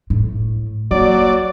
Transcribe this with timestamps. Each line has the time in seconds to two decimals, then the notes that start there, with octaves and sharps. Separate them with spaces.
0.10 A2
0.91 F#3 A#3 D5